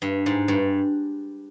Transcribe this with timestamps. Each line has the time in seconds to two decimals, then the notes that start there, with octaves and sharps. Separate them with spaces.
0.02 G2
0.26 G#2
0.48 G2